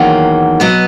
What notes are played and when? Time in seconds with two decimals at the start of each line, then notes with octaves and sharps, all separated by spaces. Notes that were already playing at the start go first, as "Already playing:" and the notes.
Already playing: E2 D#3 F#3 A#3 F#5
0.60 B2 F#3 B3 D#5